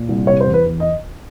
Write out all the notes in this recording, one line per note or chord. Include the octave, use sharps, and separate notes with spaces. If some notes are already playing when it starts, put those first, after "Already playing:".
Already playing: A#2
C2
C3 C#5
C5
E2
B4
E2
D#5